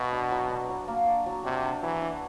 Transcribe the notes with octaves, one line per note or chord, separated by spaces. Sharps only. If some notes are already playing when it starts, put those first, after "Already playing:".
Already playing: B2 F#3 F#4
D4
F#3
D4
F#3
A#3
D4
F#3
C3 D4
D4
E3 F#3
D4